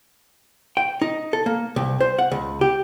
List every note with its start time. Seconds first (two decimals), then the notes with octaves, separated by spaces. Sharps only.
0.77 G5
1.02 D#4
1.33 A4
1.46 A#3
1.76 C2
2.01 C5
2.19 F#5
2.32 C#2
2.61 G4